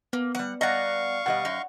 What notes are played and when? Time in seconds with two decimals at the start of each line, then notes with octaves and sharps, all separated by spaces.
0.13 A#3 B3
0.35 F#3 G3 F#5
0.61 G3 D5 D#5 F5 F#5 A#5 C#6
1.26 B2 G3 D#5 F#5
1.45 F#2 D#4